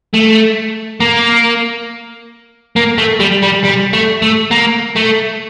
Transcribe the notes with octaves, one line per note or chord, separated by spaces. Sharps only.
A3
A#3
A#3
A3
G3
G3
G3
A3
A3
A#3
A3